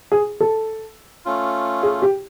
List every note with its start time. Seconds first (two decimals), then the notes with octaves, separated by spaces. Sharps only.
0.12 G#4
0.40 A4
1.25 A3 C#4 F4
1.83 G#4
2.02 G4